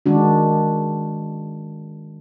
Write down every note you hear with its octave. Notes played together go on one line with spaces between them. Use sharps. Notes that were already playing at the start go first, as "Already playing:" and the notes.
D#3 G#3 D4 F#4